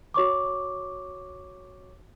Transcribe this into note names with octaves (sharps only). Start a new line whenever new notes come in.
F#4 C#5 C#6 D6